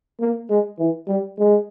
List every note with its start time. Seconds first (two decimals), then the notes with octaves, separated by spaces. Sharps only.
0.20 A#3
0.50 G#3
0.79 E3
1.08 G3
1.38 G#3